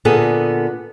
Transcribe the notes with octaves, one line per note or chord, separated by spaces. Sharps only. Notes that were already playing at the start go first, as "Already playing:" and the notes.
A#2 D3 B3 G#4 A4